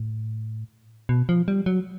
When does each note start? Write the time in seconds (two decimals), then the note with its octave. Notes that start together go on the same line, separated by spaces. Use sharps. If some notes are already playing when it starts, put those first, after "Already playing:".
Already playing: A2
1.09 B2
1.29 F3
1.48 G3
1.66 F#3